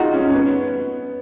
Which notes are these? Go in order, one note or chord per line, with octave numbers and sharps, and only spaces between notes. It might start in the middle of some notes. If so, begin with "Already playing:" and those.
Already playing: D#4 F4 F#4 G#4
C#4
C#4
B3